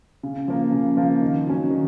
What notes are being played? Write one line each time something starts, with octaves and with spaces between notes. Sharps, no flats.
C#3
F3 A#3
C#3
F3 A#3
D#3
F#3 C#4
D#3